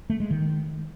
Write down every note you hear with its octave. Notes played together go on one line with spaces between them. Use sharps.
A3
G#3
D#3